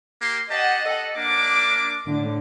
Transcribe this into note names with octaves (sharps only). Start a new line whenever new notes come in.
A#3 G4 C6
G4 D#5 F#5 A5
A4
A#3 D4 D6
A2 D3